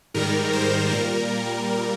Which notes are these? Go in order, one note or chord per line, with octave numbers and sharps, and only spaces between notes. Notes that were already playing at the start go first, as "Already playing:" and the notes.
G#2 D#3 G3 A#4
C5
A#2 G3 A#4